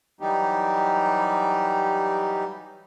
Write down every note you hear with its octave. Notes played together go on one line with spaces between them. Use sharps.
E3 F#3 G3 D#4 G4